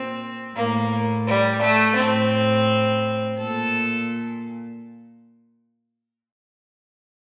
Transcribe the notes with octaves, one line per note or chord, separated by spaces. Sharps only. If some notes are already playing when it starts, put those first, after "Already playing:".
Already playing: A#2 C4
A2 A#3
G3
A3
A2 C4
A#2 A4